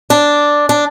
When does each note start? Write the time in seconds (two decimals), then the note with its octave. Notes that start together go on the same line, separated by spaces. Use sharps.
0.10 D4
0.69 D4